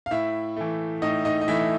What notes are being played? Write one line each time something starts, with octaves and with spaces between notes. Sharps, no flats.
F5
A2 E4 E5
E3 A3
A2 D#4 D#5
D#4 D#5
D#5
E3 A3 E4 E5